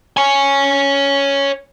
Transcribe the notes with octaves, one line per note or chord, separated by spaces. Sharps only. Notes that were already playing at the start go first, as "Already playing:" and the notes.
C#5 G#5